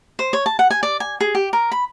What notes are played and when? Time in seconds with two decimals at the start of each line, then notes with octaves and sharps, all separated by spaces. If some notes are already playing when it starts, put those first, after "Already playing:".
0.19 C5
0.33 C#5
0.46 A5
0.59 F#5
0.70 G#5
0.83 D5
1.00 G#5
1.21 G#4
1.35 G4
1.53 A#4
1.72 B5